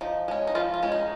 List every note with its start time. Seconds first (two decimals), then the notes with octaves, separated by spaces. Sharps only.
0.01 F3 D#4
0.28 G#3 C#4
0.47 D#4
0.55 F3 F4
0.74 F4
0.83 G#3 C#4
0.92 D#4